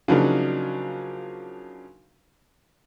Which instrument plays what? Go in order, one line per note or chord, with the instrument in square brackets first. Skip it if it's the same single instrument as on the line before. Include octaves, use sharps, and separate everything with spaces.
[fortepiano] C#3 F3 F#3 A#3 D4 D#4